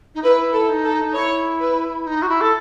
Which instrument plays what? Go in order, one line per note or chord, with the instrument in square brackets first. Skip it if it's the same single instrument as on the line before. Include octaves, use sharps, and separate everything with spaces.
[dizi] D#4
[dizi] E4 [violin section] B4
[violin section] A4
[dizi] E4
D#4
[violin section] A4
[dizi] D#4
[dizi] E4 [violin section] C#5
[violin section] B4
[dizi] D#4
F#4
E4
A4